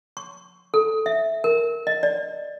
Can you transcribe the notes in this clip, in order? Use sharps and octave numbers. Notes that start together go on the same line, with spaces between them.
C#6
A4
E5
A#4
D#5
D5